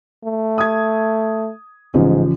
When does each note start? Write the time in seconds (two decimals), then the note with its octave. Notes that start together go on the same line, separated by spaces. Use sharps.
0.24 A3
0.58 D#6 G#6
1.94 A1 G#2 C#3 F3